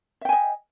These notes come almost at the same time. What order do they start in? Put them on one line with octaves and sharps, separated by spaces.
E5 G5 G#5 D#5